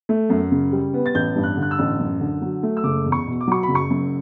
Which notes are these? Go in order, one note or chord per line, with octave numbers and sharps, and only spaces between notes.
A3
F#2
C#3
G3
B3
A6
A1 G6
G2
F#6
D3
F#6
E6
A1
F#2
D3
F#3
A3
E6
F#1 D6
E2
C#6
B2
D6
F#3 C#6
B5
F#1
C#6
F#2